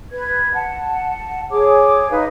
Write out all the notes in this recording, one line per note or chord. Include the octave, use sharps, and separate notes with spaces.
B4 G#6
F#5 A5
G#4 C#5 D6
D#4 B4 F5 D#6